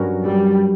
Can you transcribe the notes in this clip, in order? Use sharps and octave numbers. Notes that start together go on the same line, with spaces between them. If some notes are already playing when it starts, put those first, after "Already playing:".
Already playing: G2 F#3 C#4 F#4 A#4
G3